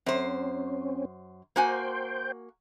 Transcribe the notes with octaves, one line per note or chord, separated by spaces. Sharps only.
F#2 C4 C#4 C5
A#3 F#4 C5 G5 G#5